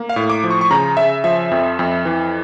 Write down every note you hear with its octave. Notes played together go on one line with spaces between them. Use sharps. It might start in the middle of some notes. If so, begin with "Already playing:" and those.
Already playing: A#3
F5
A2
D6
F3
C#6
C#6
C#3 A#5
C#3 E5
F3 E5
F2
F2
E3